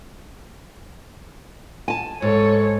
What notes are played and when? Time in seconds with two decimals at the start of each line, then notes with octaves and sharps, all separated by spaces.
1.88 G#5 A5
2.22 G#2 A4 C#5